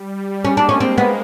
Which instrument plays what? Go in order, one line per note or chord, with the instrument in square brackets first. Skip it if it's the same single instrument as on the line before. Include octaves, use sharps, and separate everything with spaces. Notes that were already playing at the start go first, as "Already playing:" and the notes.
Already playing: [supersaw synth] G3
[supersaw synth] G#3 A#3 [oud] C#4
[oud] D4
C#4
[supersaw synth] G#3 A#3 [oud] C4
[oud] B3